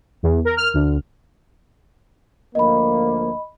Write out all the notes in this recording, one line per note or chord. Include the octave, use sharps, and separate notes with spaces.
E2
A#4
F6
D2
D2 F3 A#3 D#5 B5